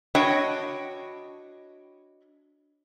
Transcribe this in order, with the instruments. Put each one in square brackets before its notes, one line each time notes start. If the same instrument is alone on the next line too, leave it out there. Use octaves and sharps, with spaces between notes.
[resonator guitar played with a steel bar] D4 E4 F#4 C#5 D#5 G5